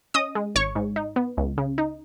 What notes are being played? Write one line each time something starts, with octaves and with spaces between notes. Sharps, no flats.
C#4 D#5 D#6
G#3
G#1 C#5 C#6
G#2
D#4
B3
C#2
C#3
D#4